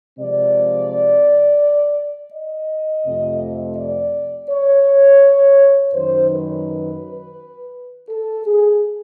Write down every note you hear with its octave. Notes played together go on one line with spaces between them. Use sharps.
C3 F3 G#3 C4 D5
D#5
F2 C3 F3 A3 C4
D5
C#5
F#2 D#3 F#3 C5
B4
A4
G#4